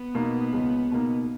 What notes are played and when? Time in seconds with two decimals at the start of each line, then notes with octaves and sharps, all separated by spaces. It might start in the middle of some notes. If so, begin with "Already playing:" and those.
Already playing: B3
0.14 B2 A#3 D#4
0.53 C#2
0.91 B2 A#3 D#4